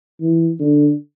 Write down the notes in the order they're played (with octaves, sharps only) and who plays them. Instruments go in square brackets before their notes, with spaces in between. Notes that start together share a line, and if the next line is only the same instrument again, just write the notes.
[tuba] E3
D3